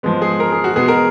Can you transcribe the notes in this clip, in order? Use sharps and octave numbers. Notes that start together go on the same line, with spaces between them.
G#2 F3 G#3 B3
G#4
A#4
G#4
F#4
B2 G#3 B3 G#4
A#4